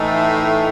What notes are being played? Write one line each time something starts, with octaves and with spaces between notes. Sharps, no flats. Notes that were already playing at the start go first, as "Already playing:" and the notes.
Already playing: A2 E3 A3 D#4